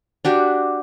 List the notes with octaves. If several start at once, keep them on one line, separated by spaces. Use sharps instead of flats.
D4 F#4 G4